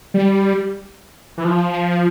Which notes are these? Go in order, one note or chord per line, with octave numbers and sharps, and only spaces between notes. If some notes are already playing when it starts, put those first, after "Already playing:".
G3
E3
F3